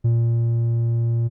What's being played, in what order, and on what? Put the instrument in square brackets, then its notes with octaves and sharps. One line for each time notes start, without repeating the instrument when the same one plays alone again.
[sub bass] A#2